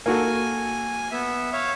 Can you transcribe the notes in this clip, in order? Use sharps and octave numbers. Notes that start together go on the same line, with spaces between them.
A#3 F#4 A4 G#5
B3 E5
C#5 E5 F5